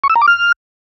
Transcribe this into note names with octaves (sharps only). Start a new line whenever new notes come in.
C#6
E6
A#5
D6
F6